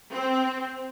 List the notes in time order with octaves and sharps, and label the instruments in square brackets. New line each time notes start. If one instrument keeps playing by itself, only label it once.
[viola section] C4